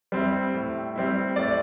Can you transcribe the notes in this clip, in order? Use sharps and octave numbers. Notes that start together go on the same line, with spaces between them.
G3 C4 E4
A2
G3 C4 E4
A2 D5